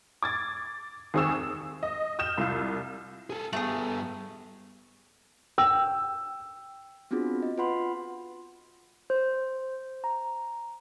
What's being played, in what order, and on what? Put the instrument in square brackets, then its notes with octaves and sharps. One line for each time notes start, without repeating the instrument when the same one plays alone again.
[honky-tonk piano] D6 G#6 A6
D#2 C4 G#4 C#6 E6 E7
E6
D#5
D#6 F6 G6 E7
C2 F4 E6
[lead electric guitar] G#4 A4
[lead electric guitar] G2 B3 [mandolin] A3 G#4
[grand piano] G5 E6
[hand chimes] B3 C4 D4 F4 F#4 G#4
D#5
F4 B4 F#5 B5 C6
[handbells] C5
A#5